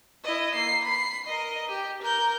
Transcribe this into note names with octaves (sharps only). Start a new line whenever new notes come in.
E4 D#5
A#3 C7
B5 C7
A#4 D#5
G4
A#4 G6